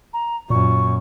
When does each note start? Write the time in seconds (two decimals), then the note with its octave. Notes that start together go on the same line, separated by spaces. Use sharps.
0.13 A#5
0.50 F#2 A#2 C#6